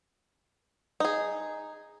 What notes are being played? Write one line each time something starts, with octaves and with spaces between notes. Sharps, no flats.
D#4 G#4